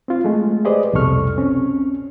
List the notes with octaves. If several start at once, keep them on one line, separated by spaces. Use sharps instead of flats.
C4 F4
G#3 A3
G4 G#4 B4 C5 D5 D#5
C2 F2 B2 A4 C#6 F6
C4 C#4